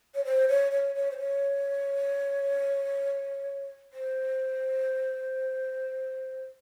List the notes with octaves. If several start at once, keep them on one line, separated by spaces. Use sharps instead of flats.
C#5
C5
C#5
C#5
C#5
C5
C#5
C5